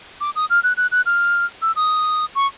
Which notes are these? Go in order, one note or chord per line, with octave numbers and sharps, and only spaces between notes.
D6
D#6
F6
F#6
F#6
F#6
F6
E6
D#6
C#6